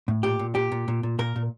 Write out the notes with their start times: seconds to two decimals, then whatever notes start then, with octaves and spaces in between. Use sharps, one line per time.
0.08 A2
0.23 A#2 G4
0.39 A#2
0.55 A#2 G4
0.72 A#2
0.88 A#2
1.03 A#2
1.19 A#2 A#4
1.36 A#2